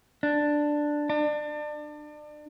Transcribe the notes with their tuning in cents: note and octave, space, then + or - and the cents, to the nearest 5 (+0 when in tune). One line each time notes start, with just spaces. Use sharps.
D4 +5
D4 +30